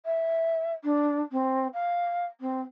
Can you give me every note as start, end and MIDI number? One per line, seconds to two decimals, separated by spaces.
0.06 0.72 76
0.84 1.21 62
1.32 1.67 60
1.73 2.25 77
2.41 2.61 60